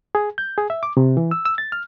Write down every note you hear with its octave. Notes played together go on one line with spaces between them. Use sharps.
G#4
G6
G#4
E5
D6
C3
E3
E6
E6
A6
F6